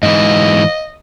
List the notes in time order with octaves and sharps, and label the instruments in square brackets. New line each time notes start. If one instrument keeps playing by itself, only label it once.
[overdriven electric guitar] G#2 E3 [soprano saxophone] D#5